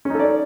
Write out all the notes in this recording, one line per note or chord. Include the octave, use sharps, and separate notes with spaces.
C#4 D#4 A4 D5